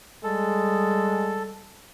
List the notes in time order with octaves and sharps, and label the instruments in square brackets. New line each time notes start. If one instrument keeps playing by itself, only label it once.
[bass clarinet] G3 [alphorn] G#3 [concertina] A4